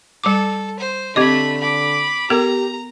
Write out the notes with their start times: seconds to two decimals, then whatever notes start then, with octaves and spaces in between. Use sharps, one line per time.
0.24 G3 A4 D6
0.79 C5
1.16 D3 A3 C4 G4 D#5 B5
1.60 B5 D6
2.30 B3 G4 A4 A#4 A#5